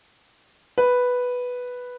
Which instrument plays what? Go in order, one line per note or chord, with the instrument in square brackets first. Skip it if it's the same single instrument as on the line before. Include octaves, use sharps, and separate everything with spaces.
[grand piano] B4